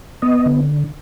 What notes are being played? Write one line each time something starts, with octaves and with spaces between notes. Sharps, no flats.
B3 D#5
D3